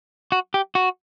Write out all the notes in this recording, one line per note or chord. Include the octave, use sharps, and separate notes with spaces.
F#4
G4
F#4